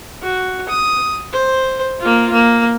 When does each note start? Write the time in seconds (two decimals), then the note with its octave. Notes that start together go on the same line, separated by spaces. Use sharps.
0.22 F#4
0.69 D#6
1.32 C5
2.00 A#3 F4
2.32 A#3